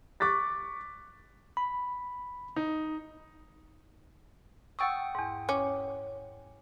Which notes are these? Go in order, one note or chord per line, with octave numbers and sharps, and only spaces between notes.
C#6 D6 F#6 A6 B6
B5
D#4
F#5 G5 C#6 D#6 E6 A6
E2 G#2
C#4 D6